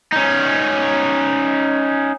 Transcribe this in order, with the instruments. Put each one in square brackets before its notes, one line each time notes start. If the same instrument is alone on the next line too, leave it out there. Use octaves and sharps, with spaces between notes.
[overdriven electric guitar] C#4 D#4